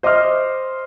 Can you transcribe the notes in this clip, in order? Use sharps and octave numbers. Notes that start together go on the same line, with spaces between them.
C5 D#5 E5 D6 F6